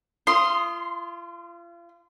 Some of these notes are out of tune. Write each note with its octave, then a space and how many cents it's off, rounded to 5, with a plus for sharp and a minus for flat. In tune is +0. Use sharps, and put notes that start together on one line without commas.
F4 -35 C6 +0 D#6 +0